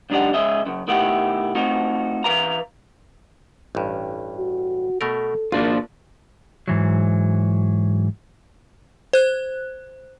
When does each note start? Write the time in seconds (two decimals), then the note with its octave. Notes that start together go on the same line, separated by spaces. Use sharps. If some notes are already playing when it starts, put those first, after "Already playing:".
0.10 C#2 F#2 D4 D#4 G4 F#5
0.34 C#2 C#3 C#4 G#4 D#5 E5
0.66 F#2 C#3
0.88 B2 D#3 A3 E4 G4 F#5
1.55 A3 C4 D#4 F4 F#4
2.24 E3 F#3 B4 F5 A#5
3.75 A1 G2
4.38 F#4
5.01 B2 A3 A4 A#4
5.52 G#1 A#3 D4 F4
6.68 G#2 E3 F#3
9.13 C5 F#6